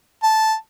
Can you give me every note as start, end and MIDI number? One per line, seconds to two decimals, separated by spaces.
0.23 0.55 81